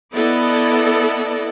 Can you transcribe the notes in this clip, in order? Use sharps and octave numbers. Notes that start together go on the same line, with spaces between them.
B3 E4 A4 D5 D#5